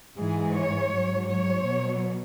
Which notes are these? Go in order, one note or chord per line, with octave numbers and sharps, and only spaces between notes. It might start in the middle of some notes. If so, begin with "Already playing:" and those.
G#2 E3 G#3 G#4
C#5
G#2 F#3
C#5
B2 F#3